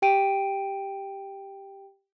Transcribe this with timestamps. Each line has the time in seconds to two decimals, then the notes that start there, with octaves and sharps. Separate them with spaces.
0.02 G4 G5 D7 D#7